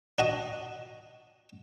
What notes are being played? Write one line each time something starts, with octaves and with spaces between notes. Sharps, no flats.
D4 F#4 D#5